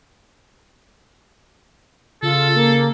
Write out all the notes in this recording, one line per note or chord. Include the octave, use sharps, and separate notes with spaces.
C#3 F4 A4
A#3